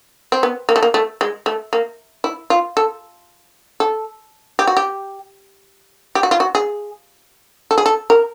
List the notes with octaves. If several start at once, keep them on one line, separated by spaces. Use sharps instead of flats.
C4
B3
A#3
A3
A#3
A3
G#3
A3
A#3
E4
F4
A4
A4
G4
F#4
G4
G4
F#4
F4
F#4
G#4
A4
G#4
A4
A#4